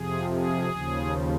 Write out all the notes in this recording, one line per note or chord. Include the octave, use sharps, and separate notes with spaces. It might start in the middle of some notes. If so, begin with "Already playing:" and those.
Already playing: F2 C3 F3 G#4
G#4
D#2 C#3 F3